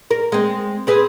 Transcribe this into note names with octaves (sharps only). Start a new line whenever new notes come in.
A#4
G#3 C4
C4 G#4 B4